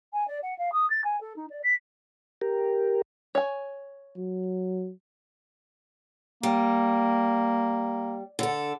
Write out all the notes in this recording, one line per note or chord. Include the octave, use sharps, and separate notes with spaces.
G#5
D5
F#5
F5
D#6
A6
G#5
A4
D#4
D5
B6
G4 A#4
C#5 G#5
F#3
G3 A#3
D3 A4